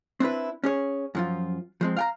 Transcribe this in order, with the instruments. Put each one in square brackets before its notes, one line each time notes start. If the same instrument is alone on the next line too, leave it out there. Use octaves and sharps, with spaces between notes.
[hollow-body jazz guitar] C4 D4 E4 B4
C#4 G#4 C#5
F#2 F3 F4
F3 G#3 C4
F5 G5 A#5